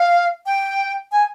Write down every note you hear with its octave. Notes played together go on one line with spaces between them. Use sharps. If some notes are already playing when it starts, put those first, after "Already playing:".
Already playing: F5
G5
G#5